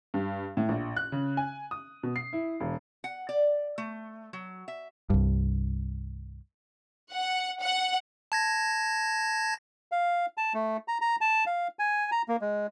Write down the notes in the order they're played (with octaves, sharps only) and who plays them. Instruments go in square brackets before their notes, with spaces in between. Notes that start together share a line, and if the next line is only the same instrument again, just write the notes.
[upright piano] G2
A2
A#1
F#6
C#3
G#5
D#6
B2
C7
E4
E1
[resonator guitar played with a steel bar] F#5
D5
A3
F#3
E5
[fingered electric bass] C2 G2
[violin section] F#5
F#5
[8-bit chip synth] A5 G#6 A#6
[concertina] F5
A5
A3
A#5
A#5
A5
F5
G#5
A#5
A#3
G#3